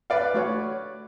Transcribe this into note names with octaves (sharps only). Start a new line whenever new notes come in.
B4 D5 F5
A3 F#4 C#5